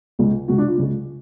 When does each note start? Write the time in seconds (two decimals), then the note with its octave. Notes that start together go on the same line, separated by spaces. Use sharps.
0.19 C#2 C#3 G#3
0.48 C#2 C#3 G#3 F#4
0.58 D4
0.68 F4
0.78 C#2 C#3 G#3